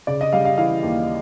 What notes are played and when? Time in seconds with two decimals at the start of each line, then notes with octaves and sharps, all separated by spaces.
0.07 C#3 D5
0.21 D#5
0.32 G3 F5
0.45 F5
0.58 E3 F5
0.83 D#2